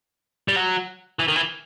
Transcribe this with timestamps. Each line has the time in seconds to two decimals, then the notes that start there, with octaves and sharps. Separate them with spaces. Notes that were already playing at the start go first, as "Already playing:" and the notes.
0.48 G3
0.56 F#3
1.19 E3
1.28 D#3
1.36 E3